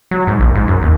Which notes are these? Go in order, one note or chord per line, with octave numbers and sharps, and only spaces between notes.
F#3
G#2
A#1
G#2
F#2
D#2